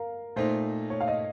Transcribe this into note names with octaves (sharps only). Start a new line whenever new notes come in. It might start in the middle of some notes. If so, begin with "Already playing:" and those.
Already playing: A#4 F5
A#2 A3 D#4 C5
C#5
F5
D#5